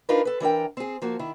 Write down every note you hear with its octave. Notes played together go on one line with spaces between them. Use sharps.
D4 D#4 F4 A#4 B4
A4 B4
E3 D4 A#4 G5
C4 G#4
F3 A#3 F#4
D#3 E4